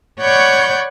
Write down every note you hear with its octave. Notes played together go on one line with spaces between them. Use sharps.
C#5 D5 F#5 B5 C#6 G6